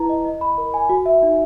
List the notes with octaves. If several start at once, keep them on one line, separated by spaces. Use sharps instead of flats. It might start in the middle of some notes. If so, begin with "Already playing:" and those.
Already playing: E4 B4 A#5
D#5
D#5
B5
A#4
G#5
F#4
E5
D#4